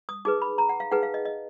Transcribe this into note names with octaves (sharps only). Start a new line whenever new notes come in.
D#6
D#4 G#4 B4 D6
B5
A#5
F#5
F5
D#4 G#4 B4 F#5
F5
D#5
D#5